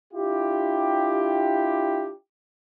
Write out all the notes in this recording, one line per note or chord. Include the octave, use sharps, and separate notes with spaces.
D4 E4 F4 G4